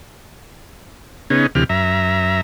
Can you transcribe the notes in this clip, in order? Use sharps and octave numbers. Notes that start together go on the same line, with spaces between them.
C#3 B3 C#4 D#4 G#4
D2 C3 E3 G4 F6
F#2 E5 A#5